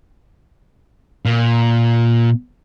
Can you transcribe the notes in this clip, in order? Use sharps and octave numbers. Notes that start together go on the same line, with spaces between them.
A#2